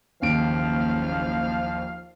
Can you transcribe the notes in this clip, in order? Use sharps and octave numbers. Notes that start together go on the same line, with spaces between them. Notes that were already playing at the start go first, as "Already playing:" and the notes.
F#1 D#2 F3 F5 D7